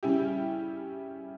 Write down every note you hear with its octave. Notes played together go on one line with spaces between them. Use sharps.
C#3 G3 C#4 E4 G4